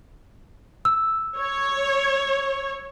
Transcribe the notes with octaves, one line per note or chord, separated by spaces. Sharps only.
E6
C#5